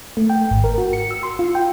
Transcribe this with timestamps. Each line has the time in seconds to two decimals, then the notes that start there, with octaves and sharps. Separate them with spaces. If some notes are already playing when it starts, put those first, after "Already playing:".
0.17 A3
0.30 G5
0.51 G#1
0.64 A#4
0.78 F#4
0.93 C#7
1.11 E6
1.23 C6
1.39 F4
1.55 G5